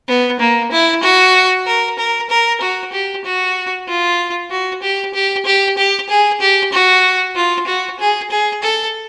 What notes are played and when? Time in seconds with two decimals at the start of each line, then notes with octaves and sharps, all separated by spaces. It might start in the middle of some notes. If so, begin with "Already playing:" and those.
0.08 B3
0.40 A#3
0.72 E4
1.03 F#4
1.66 A#4
1.98 A#4
2.30 A#4
2.61 F#4
2.92 G4
3.25 F#4
3.88 F4
4.50 F#4
4.82 G4
5.14 G4
5.46 G4
5.78 G4
6.09 G#4
6.41 G4
6.72 F#4
7.36 F4
7.67 F#4
7.99 G#4
8.31 G#4
8.63 A4